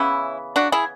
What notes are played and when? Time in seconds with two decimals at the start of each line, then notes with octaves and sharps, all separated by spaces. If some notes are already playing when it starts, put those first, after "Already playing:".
Already playing: C#3 E3 B3 C#4 E4
0.56 D4 F#4
0.72 E4 G#4